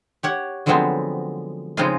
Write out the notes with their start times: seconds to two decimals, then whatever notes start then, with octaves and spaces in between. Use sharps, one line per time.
0.23 G4 C#5 F#5
0.66 D3 F3 F#3 G#3 B3 C4
1.77 C#3 F3 G#3 C4 D#4 F4